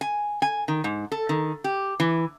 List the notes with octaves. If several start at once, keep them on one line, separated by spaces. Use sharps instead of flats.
G#5
G#5
D#3
G#2
A4
D#3
G4
E3